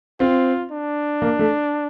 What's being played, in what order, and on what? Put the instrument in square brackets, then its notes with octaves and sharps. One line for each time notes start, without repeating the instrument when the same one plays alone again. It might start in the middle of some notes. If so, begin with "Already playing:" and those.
[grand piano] C4 [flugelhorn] F4
[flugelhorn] D4
[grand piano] A#3
A3